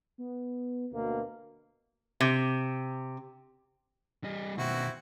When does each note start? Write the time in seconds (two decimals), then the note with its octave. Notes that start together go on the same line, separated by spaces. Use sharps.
0.18 B3
0.92 D2 B2 A#3
2.21 C3
4.24 G3 D#5
4.58 B2 D#3 C4 E4 F#4